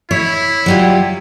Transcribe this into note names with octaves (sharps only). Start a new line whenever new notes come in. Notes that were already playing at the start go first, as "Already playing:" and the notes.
E4 C#5
F#3 G3 F4